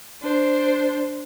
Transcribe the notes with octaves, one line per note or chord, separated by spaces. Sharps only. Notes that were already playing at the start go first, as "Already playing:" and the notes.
D4 C5